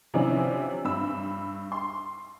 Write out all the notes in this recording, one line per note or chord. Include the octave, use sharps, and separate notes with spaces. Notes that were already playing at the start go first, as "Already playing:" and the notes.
C3 E3 F3 C#4 D4
G2 B5 E6
C6